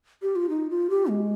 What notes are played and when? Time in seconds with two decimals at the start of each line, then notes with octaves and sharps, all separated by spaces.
0.22 G4
0.36 F4
0.49 D#4
0.70 F4
0.90 G4
1.09 G#3